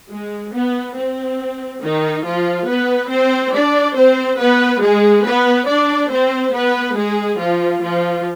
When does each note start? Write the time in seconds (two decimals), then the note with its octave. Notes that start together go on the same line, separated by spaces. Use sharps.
0.10 G#3
0.52 B3
0.96 C4
1.82 D#3 D#4
2.25 F3 F4
2.67 B3 B4
3.10 C4 C5
3.53 D4 D5
3.95 C4 C5
4.39 B3 B4
4.82 G#3 G#4
5.25 B3 B4
5.67 D4 D5
6.10 C4 C5
6.53 B3 B4
6.96 G#3 G#4
7.39 F3 F4
7.82 F3 F4